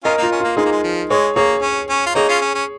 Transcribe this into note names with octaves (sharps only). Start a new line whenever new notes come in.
C#4 F4 A#4 D#5
A#3 D#4 F4
C#4
A#3 F4
G#3 D#4 G#4
A#3
G#3
F3
G#3 G#4 C#5
A#3 G#4 C#5
C#4
C#4
F4
A#3 D#4 G#4 C#5
C#4 F4
C#4
C#4